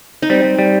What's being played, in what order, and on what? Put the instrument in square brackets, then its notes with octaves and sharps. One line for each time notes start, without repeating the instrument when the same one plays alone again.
[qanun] D#4
[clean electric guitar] G3 [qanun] C4
[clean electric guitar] G3
G3